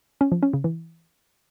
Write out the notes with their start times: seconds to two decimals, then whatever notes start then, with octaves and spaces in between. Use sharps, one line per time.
0.21 C#4
0.32 F3
0.43 C#4
0.53 C#3
0.64 E3